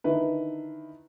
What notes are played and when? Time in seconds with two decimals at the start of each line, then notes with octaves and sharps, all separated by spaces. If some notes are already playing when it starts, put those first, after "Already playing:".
0.04 D3 D#3 E4 B4